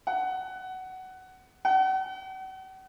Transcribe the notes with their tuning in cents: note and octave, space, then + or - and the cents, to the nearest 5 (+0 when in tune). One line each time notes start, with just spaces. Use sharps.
F#5 +15
F#5 +40